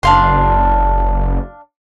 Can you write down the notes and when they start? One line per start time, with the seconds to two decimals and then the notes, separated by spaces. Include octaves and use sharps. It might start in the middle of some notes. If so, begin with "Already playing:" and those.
0.03 F#1 D4 F5 C6